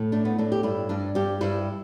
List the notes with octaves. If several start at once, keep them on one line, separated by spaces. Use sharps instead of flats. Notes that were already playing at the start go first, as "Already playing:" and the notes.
Already playing: A2
A3 D4
B3
A2 D4
G4
G2 E4
G2 D4
G2 G4
G2 E4